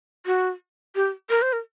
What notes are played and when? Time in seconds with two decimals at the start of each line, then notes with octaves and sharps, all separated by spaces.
0.26 F#4
0.95 G4
1.30 A#4
1.42 C5
1.53 A#4